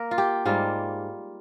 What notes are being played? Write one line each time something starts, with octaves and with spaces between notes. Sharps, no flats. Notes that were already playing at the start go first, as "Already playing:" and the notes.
Already playing: A#3 A#4
F4
G4
G#2 G3 A#3 F4